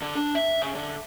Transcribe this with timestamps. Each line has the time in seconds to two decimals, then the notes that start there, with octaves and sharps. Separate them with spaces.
0.02 D3
0.15 D4
0.35 E5
0.62 C#3
0.75 D3